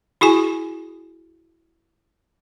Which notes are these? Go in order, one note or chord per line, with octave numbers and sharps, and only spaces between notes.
E4 F#4 G#4 G#5